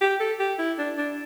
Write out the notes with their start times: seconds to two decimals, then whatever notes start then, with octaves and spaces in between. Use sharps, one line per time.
0.01 G4
0.20 A4
0.39 G4
0.59 E4
0.78 D4
0.97 D4